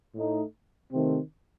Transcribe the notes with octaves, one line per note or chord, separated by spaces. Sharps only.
A2 A3 D#4
C3 D#3 A3 C4